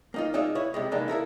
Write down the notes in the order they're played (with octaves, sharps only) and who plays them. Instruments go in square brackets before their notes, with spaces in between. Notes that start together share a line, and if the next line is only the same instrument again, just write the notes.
[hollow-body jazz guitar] A#3 D#4 F4
G#3 D#4 F4 D5 E5
E4 C#5
C3 G3 G#3
E3 G#3 A#3 D4 D#4
E4 A4 A#4 E5